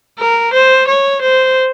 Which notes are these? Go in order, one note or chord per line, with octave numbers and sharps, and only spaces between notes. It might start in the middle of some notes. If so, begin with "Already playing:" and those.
A#4
C5
C#5
C5